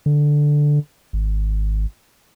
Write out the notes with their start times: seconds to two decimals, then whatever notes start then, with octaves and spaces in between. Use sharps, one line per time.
0.06 D3
1.13 G#1